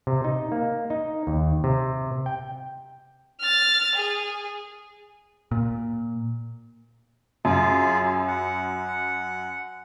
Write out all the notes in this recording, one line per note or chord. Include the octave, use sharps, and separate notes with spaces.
C3
D#4
A#3
D#4
D#2
C3
G5
F6 A6
G#4
A#2
F#2 F4 G#4
F#5